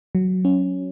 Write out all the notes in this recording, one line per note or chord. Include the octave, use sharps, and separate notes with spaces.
F#3
C#4